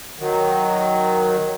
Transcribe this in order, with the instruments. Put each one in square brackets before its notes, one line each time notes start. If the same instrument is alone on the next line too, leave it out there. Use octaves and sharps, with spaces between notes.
[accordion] D#3 F#3